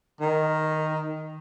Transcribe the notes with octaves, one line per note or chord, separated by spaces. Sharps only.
D#3